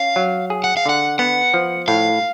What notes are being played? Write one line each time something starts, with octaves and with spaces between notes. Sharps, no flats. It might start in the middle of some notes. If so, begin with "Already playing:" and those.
Already playing: C#4 F5
F#3
G#4
F#5
F5
D3 F#5
B3 F#5
F3
A2 F5